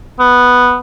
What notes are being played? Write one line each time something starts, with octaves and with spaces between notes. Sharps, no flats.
B3